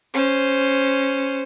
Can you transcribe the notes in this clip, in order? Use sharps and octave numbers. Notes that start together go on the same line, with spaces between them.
C#4 C5